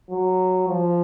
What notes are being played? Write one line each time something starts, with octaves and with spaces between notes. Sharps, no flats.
F#3
F3